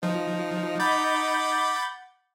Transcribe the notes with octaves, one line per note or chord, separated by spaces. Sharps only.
F3 D#4
F#5 B5 D6 G6 A6